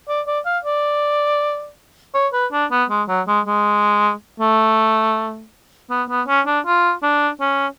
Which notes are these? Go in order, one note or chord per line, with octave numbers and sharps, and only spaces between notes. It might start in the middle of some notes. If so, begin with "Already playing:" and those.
D5
D5
F5
D5
C#5
B4
D4
B3
G#3
F#3
G#3
G#3
A3
B3
B3
C#4
D4
F4
D4
C#4